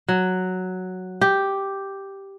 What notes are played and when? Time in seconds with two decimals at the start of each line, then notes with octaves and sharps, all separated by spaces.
0.08 F#3
1.21 G4